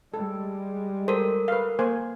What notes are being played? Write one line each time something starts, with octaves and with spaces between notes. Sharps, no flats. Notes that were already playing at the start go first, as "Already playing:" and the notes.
G3 G#3 A4
A4 A#4 C5
B4 F5
A#3 C5 G#5